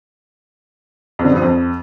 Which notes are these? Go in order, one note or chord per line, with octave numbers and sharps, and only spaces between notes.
F2
D3
G2
F3
F2